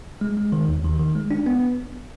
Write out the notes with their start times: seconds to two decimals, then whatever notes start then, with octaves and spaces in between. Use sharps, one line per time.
0.21 G#3
0.37 G#3
0.52 D#3
0.68 D#2
0.84 D#3
0.99 D#3
1.15 G#3
1.31 D4
1.46 B3